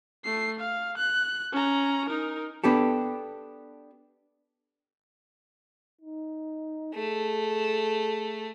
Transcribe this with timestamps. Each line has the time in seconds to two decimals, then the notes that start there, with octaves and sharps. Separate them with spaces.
0.24 A3 C7
0.60 F5
0.97 F#6
1.52 C#4 A#5
2.09 D#4 A#4
2.64 B3 D4 G4 A4
6.01 D#4
6.94 A3 G#4